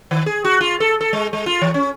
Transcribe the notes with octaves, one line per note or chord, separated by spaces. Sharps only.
D#3
G#4
F#4
F4
A4
A4
G#3
G#3
F4
E3
C#4